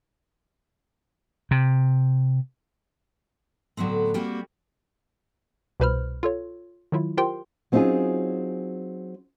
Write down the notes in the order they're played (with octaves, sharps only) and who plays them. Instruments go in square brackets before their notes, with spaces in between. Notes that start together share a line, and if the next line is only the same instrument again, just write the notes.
[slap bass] C3
[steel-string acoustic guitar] A2 D3 F#3 B3 C4
G3 A#3 C4 F#4
[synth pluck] C2 B2 B4 C5 B5 F6
F4 A4 C#5
D#3 F#3 E4 F4
F4 G4 A#4 C5 G5 C6
[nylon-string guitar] F#3 C4 C#4 D#4 F4 G#4